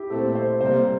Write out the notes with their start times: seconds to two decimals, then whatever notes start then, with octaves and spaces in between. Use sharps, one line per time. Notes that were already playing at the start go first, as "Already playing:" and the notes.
Already playing: E4 G4
0.10 A#2 A3 C4 A4
0.35 C5
0.60 C3 G3 A#3 C5